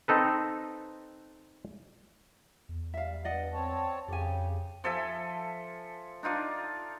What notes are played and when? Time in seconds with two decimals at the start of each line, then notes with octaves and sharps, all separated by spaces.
0.08 C4 D#4 A4 B4
2.69 E2
2.94 G3 E5 F5
3.24 G2 D5 D#5 F#5
3.53 C4 C#5 A5
4.08 F2 C#3 G4 A4 G#5
4.84 F3 A4 E5 G#5
6.23 D4 D#4 F4 D6